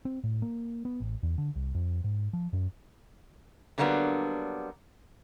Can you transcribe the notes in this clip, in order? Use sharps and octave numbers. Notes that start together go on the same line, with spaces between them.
C4
A2
A#3
B3
A1
E2
D3
C2
F2
G#2
F3
F#2
D3 F#3 G3 A#3 B3 D4